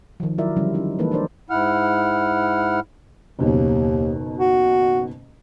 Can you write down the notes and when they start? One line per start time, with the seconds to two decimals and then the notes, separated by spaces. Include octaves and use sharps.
0.20 D#3 F3
0.38 F#3 E4 F4 A#4 D5 E5
0.57 D3 F3 G3 C#4 E4
0.74 C#4 D#4 E4
0.99 E3 G#3 A#3 D#4 A4 B4
1.11 D4 D#4 A#4 C5 D5
1.50 G#2 E4 F#5 F6
3.39 F#1 D#2 B2 D#3
4.38 F#4